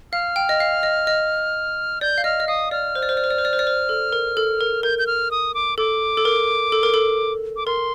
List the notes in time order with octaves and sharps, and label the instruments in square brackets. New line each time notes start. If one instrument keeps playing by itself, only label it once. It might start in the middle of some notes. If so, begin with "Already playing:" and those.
[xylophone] F5 [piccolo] F6
[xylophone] G5
D#5
F5
D#5
D#5
[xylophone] D5 [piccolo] G6
[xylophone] F5
[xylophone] D#5 [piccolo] F6
[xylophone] D#5
[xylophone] F5 [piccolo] D#6
[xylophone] D5 [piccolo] F6
[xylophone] C5
D5
C5
D5
C5
D5
C5
D5
C5
D5
C5
A4
A#4
A4
A#4
[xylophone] A#4 [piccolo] G6
[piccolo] G6
F6
D#6
D6
[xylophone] A4 [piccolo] D6
[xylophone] A4
A#4
A4
A#4
A4
[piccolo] D6
[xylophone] A#4 [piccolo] C6